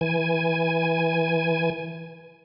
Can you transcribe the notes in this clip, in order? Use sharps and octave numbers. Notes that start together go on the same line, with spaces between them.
E3 G#5